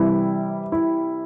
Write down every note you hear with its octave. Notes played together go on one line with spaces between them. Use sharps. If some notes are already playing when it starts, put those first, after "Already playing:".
Already playing: C3 E3 G3 E4
E4